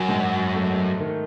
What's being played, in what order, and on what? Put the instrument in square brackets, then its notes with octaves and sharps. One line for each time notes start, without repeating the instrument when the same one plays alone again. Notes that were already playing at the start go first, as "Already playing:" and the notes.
Already playing: [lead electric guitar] F#2 [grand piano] F#3
[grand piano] G#2
A3
D#3